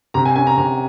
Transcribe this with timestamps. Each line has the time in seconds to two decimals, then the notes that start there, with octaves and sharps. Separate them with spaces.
0.14 C3 A#5
0.26 G#5
0.36 C#4 G#5
0.47 A#5
0.57 C3 A#5